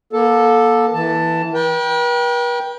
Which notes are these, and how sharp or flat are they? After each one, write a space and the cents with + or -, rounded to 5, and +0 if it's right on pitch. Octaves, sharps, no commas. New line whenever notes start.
A#3 +30 A4 +0
E3 -5 A5 +10
B4 -45 G5 +0